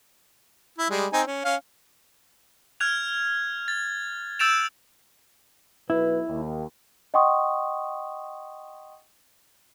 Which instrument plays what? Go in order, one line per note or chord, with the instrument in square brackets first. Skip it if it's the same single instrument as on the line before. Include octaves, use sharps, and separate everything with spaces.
[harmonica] E4
G3 G#3
C4 D#4 G#5
C#4
C#4 F5
[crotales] F6 F#6 G#6 F7
A6
E6 G6 A6 D7 E7 F7
[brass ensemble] B1 B4 [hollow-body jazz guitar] E4
[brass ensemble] D#2
[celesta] D#5 F#5 G5 C6 C#6 D#6